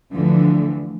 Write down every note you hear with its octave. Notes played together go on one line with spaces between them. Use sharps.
D2 D3 E3 F3